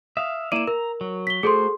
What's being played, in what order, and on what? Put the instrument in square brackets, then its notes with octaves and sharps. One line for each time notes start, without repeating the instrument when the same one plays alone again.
[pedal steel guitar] E5 F5 [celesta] D#6
[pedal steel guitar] A#3 E4 D5 [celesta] D#7 E7
[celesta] A#4 [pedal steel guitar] A#5
[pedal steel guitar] F#3
[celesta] B6 G7
[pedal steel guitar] A3 F#4 C5 [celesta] G#4 A4 C6